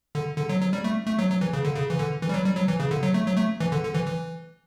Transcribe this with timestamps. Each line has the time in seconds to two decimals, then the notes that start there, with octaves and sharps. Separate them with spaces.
0.15 D3
0.38 D3
0.49 F#3
0.61 F#3
0.73 G3
0.84 A3
1.07 A3
1.19 F#3
1.30 F#3
1.41 E3
1.53 C#3
1.65 D3
1.76 C#3
1.90 E3
1.99 D3
2.22 E3
2.29 G3
2.34 F#3
2.45 G3
2.57 F#3
2.68 E3
2.80 C#3
2.91 D3
3.03 F#3
3.14 A3
3.26 F#3
3.37 A3
3.60 E3
3.72 D3
3.84 D3
3.94 E3
4.06 E3